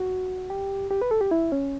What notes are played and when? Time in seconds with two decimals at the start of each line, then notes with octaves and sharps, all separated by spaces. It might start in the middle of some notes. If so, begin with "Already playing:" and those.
Already playing: F#4
0.50 G4
0.91 G4
1.01 B4
1.11 A4
1.21 G4
1.31 E4
1.52 C#4